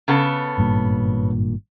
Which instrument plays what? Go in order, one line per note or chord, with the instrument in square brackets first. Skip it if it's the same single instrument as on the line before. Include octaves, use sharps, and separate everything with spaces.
[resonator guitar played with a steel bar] C#3 B3 A4
[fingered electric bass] G#1 G2 A#2